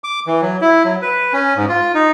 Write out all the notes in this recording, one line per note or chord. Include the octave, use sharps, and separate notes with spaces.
D6
E3
F#3
E4
F#3
B4
C#4
G#2
F4
D#4